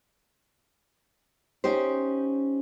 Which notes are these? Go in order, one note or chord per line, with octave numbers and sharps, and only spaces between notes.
C#4 D#4 G4 C5